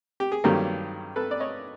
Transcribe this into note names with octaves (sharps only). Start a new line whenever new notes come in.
G4
G#4
G2 D#3 F#3 A#3 G4 A4
A4 B4
D5
C#5 D#5